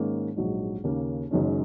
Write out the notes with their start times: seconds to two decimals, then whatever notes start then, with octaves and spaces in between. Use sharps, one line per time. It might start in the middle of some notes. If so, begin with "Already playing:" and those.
Already playing: G#2 D#3 A#3 C#4
0.36 A#1 G#2 F#3 D#4
0.84 D#2 C#3 A#3 C#4
1.31 F#1 F#2 D#3 G#3 C#4